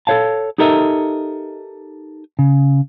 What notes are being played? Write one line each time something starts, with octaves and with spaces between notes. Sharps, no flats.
A4 C5 C#5 F5 A5
D#4 G4 A4 A#4 D#5 E5
C#3